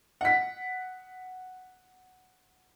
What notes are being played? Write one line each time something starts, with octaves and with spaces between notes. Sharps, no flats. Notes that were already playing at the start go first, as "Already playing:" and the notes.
F#5 B6